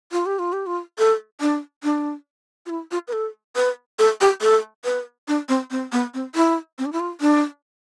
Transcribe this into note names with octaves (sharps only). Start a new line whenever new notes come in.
F4
G4
F4
G4
F4
A4
D4
D4
F4
E4
F4
B4
A4
B4
A4
G4
A4
B4
D4
C4
C4
B3
C4
E4
C4
D4
E4
F4
D4